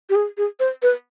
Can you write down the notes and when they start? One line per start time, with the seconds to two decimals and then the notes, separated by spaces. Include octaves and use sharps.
0.10 G4
0.15 G#4
0.37 G#4
0.60 C5
0.82 B4